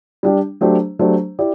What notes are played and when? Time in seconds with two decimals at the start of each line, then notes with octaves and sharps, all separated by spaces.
0.23 G3 D4 G4
0.61 F#3 A3 D4 G4 C5
0.99 F#3 A3 D4 G4 C5
1.39 E4 G4 D5